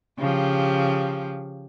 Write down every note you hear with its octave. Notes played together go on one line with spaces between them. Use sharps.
C#3 F3 G4